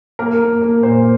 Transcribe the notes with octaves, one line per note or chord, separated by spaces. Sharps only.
A#3 A#4
A#3
A#3
A#2 C5